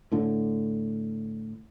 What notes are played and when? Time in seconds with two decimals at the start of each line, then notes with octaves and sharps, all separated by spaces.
0.12 A2 D3